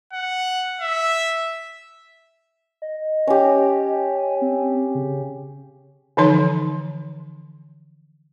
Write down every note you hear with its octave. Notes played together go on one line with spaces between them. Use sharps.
F#5
E5
D#5
C#4 G4
G#5
C4
C#3
D3 E3 F3 D#4 C#5 C6